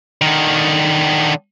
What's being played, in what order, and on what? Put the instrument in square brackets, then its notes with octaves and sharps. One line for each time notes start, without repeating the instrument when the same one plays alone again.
[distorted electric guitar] D3 D#3